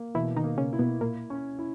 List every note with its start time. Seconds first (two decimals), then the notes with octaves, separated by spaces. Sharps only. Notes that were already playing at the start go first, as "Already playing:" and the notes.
Already playing: A#3
0.15 B2 E3 E4
0.36 D#3 D#4
0.44 A#3
0.58 C#3 C#4
0.73 E4
0.79 B2 B3
1.01 A#2 A#3 E4
1.30 C#4
1.59 E4